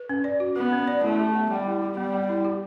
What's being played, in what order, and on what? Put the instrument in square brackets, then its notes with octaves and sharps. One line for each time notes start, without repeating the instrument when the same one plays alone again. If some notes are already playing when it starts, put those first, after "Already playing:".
Already playing: [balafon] B4
C#4
D5
F#4
[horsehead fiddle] B3 [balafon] B4
[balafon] C#4
D5
[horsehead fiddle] A3 [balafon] E4
[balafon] G4
B3
[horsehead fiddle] G3 [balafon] B3
[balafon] E4
G4
[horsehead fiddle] G3 [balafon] B3
[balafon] B3
E4
G4